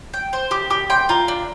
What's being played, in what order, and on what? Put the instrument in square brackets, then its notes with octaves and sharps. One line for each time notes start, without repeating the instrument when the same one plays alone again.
[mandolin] G5
C5
[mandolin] G4 [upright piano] D6
[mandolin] G4 [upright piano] D6
[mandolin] G5 [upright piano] C6
[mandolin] F4 [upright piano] A#5
[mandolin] D4